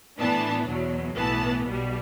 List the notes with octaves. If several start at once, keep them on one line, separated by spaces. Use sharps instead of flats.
A2 E3 B3 D4 A5
E2 B2 F#3
B1 A2 E3 B3 A5
B1 B2 G3